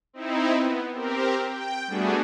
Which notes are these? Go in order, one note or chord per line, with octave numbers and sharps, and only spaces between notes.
C4 D#4 E4
B3
C4 G4 A#4
G5
G3 A3 B3 D4 F#4 G#4